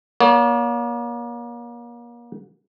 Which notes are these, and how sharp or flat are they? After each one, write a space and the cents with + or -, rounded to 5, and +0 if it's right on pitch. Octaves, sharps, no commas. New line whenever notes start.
A#3 +35 C#5 +45